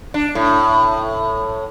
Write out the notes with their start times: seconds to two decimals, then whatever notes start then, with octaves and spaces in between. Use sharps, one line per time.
0.14 D4
0.35 A2